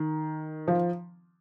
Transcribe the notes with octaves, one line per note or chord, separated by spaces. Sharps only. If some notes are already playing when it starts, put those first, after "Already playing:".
Already playing: D#3
F3